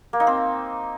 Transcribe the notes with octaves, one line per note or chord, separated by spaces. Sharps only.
A#3
D#4
C4